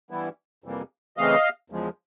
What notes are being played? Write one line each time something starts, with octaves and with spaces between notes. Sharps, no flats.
G2 E3 G3 B3 E4
F2 C3 E3 G3 A#3
C#3 E3 A3 C4 D#5 F5
E2 C#3 F3 G#3